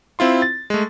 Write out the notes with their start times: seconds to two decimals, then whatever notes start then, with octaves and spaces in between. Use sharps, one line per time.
0.19 C4 E4 F4 C6
0.42 A6
0.70 G#3 A3